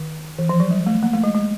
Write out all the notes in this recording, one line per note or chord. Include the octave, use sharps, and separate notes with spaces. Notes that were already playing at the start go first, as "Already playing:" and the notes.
Already playing: D#3
E3
F3
F#3
G3
A3
A#3
A3
G#3
G#3